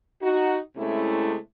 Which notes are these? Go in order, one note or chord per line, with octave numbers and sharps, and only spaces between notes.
D#4 F#4
C3 G#3 A3 C#4 E4